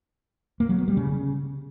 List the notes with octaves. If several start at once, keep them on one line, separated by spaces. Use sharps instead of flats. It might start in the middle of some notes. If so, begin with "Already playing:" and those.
A#3
F#3
B3
G3
C#3